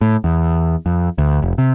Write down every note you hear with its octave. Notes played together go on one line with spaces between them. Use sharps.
A2
E2
F2
D2
F1
C3